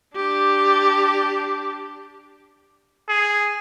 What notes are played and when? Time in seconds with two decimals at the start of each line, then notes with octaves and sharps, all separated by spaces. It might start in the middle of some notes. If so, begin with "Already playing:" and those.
0.16 D4 G4
3.09 G#4